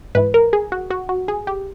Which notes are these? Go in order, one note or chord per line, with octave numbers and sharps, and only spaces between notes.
G#2 E3 B4
A#4
G#4
F#4
F#4
F#4
G#4
G4